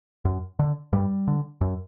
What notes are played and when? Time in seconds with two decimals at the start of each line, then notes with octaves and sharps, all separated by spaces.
0.25 F#2
0.59 D3
0.93 G2 G3
1.28 D3
1.61 F#2